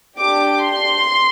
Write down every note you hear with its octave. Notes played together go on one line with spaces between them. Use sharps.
D4 G4 D6
C6